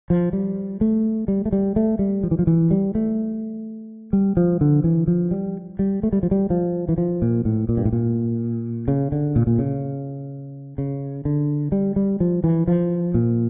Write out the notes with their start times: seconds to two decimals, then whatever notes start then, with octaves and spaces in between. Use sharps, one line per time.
0.10 F3
0.33 G3
0.81 A3
1.28 G3
1.45 A3
1.52 G3
1.76 A3
1.99 G3
2.23 F3
2.31 E3
2.39 F3
2.47 E3
2.71 G3
2.95 A3
4.13 G3
4.37 F3
4.61 D3
4.84 E3
5.08 F3
5.31 G3
5.79 G3
6.03 A3
6.13 G3
6.23 F3
6.31 G3
6.50 F3
6.89 E3
6.98 F3
7.22 A#2
7.45 A2
7.69 A#2
7.77 G2
7.85 A2
7.93 A#2
8.88 C#3
9.12 D3
9.36 A#2
9.47 A#2
9.59 C#3
10.78 C#3
11.25 D3
11.72 G3
11.96 G3
12.20 F3
12.44 E3
12.68 F3
13.14 A#2